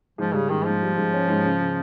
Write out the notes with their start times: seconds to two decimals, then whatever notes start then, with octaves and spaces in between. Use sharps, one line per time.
0.18 G#2 F3
0.34 C#3 G3
0.50 G#2 D#3
0.66 G#2 F3
0.82 G3
0.97 G#2
1.13 C#4
1.28 G#2
1.44 C#3
1.60 C#3